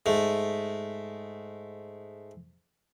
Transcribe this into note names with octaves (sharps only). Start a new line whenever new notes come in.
G#2 A3